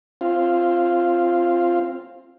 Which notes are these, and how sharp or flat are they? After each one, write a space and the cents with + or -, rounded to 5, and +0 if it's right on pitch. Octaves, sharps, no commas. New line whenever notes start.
C4 +20 F4 -10